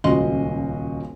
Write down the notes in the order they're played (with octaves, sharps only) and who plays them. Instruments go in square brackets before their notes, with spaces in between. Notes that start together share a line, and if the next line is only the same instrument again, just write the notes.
[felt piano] D#1 C#2 F#4 D#5 C6